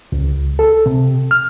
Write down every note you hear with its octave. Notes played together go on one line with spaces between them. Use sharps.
C#2
A4
C3
F6